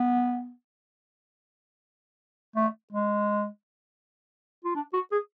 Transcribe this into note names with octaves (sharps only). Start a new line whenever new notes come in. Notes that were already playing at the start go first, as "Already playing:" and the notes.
Already playing: B3
A3
G#3
F4
D4
F#4
G#4